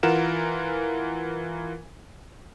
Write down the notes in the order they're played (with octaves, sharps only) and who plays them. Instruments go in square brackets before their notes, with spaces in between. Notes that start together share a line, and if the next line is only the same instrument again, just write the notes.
[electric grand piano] E3 F4 A#4 F#5 E7